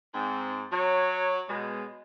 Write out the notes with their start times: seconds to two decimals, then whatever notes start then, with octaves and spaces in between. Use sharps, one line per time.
0.13 G#2 C4
0.71 F#3 C#5
1.48 B2 G#3